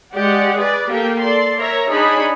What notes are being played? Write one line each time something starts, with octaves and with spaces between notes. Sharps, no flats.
G#3 G4 D5 F#5
G#4 B4 D5
A#3 G4 A4 G5
A4 D5 C6
A#4 C#5 E5 A#5
D4 D#4 G#4 C#5 B5